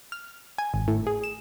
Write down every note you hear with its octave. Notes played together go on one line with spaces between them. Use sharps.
F6
G#5
G#1
A2
G#4
E7